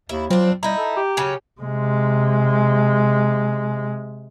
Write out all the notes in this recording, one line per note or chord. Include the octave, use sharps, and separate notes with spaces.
D#2 E4
F#3 C4 D4 F4 C5
G3 D#4 E4 A#5 G6
A4
G4
C#3 F#3 C#4
C3 G#3